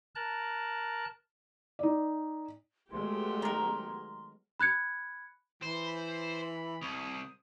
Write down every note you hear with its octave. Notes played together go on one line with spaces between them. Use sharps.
A#4 A5 F#6
D#4 D5
F#3 G#3 A3 B3 G4 C6
D#3 A#4
B5 F#6 G#6 C#7
E3 C5
B5
C2 D#6